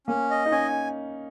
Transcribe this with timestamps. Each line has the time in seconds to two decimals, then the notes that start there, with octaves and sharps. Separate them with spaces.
0.07 A#3 C#4
0.30 D#5
0.46 D#4
0.52 C#4 G#5